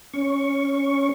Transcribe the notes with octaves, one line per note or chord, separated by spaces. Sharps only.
C#4 C#6